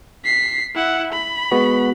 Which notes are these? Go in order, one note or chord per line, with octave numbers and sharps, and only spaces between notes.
B6 C7
E4 F#5
B5
G#3 B3 F#4